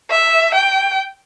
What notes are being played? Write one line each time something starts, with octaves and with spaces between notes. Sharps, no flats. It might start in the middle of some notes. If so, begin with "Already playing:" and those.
E5
G5